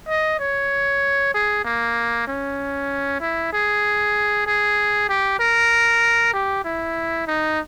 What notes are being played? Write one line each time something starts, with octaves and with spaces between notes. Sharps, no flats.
D#5
C#5
G#4
A#3
C#4
E4
G#4
G#4
G4
A#4
G4
E4
D#4